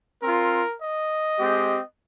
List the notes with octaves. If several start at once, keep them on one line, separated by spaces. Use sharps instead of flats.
C4 F4 A#4
D#5
G#3 C4 G4